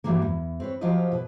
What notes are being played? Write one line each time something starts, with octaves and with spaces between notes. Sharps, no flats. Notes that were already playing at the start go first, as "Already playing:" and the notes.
G2 C3 E3 F#3 G3 A#3
E2
C4 B4 C#5
F3 F#3 F4 G4 C5 D#5
B2 B4